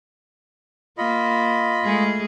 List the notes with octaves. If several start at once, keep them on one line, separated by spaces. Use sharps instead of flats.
A#3 F4 D#5 B5
G#3 A3 G#4